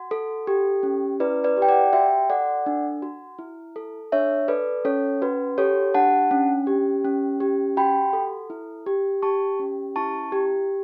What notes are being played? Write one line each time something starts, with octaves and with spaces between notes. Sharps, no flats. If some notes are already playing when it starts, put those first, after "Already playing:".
Already playing: F#4
A4
G4
C#4
E4 B4 D5
B4 D5
G4
G5
D5 F#5
F#4 E5 G5
A4 D5 F#5
D4
F#4
E4
A4
D4 C#5 E5
A4 B4 D5
C#4 A4 C#5
F#4 B4
G4 A4 C#5
D4 F#5 A5
C#4
G4
C#4
G4
F#4 G5 B5
A4
E4
G4
G4 A5 C#6
C#4
E4 A5 C#6
G4